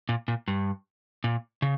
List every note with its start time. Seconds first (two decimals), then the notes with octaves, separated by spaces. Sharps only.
0.09 A#2
0.28 A#2
0.48 G2
1.24 A#2
1.62 C#3